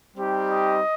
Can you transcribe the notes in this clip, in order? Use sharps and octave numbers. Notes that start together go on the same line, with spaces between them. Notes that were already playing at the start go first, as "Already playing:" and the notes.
G3 C4 D#4 G4
D#5